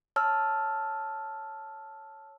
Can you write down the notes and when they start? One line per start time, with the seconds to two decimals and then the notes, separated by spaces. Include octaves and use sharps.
0.16 C#5 A5 E6 F6